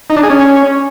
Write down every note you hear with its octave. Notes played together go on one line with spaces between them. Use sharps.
D#4
D4
G#4
C#4